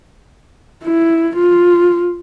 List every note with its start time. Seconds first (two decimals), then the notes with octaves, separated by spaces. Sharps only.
0.84 E4
1.36 F4